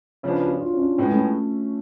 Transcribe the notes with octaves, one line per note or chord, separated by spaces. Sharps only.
C#3 F3 B3 D4 C#5
F#4
D4
F4
C#4
D4
A2 G#3 B3 C#4
A3